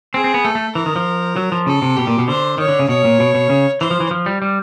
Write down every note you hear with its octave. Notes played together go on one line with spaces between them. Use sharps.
C4 G#4
C4
B3
A3 A4
A3
E3 A#4
D#3
F3
F#3
F3
C#3 A4
C3
B2 G4
A#2
B2
D3 C5
D#3 C#5
D3
C#3
B2 C#5
A#2
B2
B2
C#3
E3 C5
F3
E3
F3
G3
G3